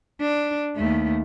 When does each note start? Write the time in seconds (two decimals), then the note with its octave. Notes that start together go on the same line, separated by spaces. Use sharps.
0.21 D4
0.76 D#2 A3